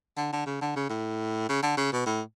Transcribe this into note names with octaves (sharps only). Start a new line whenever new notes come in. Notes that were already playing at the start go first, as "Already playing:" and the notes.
D3
D3
C#3
D3
C#3
A2
C#3
D3
C#3
B2
A2